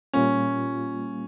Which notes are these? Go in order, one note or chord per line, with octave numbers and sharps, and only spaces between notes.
A#2 G3 A#3 C#4 F4